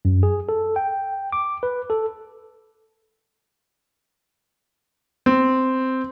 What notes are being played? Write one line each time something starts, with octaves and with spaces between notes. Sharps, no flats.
F#2
G#4
A4
G5
D6
B4
A4
C4